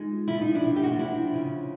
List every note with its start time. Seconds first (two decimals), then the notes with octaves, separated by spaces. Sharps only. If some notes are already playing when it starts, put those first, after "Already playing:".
Already playing: G#3 D#4 F4
0.28 F3 E4
0.41 D#4
0.54 D4 E4
0.63 C3
0.76 G4
0.83 F#4
0.91 F4
0.99 F3 D4 E4
1.34 C#3